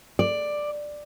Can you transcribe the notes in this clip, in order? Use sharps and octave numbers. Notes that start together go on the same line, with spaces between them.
D5